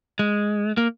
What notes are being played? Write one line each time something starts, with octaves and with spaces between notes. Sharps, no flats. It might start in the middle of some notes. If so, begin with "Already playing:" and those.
G#3
A#3